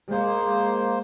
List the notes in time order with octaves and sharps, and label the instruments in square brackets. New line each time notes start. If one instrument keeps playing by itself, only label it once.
[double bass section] G#3 [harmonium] A#3 C5